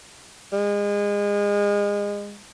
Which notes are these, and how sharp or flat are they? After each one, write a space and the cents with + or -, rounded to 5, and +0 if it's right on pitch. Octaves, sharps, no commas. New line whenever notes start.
G#3 -30